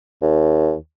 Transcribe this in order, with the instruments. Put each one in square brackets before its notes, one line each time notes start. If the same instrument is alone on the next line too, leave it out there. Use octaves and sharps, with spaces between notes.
[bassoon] D#2